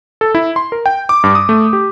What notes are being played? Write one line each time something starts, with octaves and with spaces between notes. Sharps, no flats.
A4
E4
C6
A#4
G5
D6
G2
D#6
A3
G4